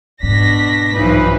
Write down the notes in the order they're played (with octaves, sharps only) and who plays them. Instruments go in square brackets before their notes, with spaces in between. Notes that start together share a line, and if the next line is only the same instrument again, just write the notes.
[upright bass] G#2 [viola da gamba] B2 D4 [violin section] A#6 B6
[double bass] B1 D#4 [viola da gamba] G2 E3 F3 [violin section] B4